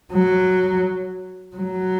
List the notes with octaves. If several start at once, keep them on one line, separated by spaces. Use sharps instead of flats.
F#3
F#3